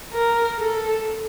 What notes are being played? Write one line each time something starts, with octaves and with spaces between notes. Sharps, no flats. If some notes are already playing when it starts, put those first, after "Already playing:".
A#4
A4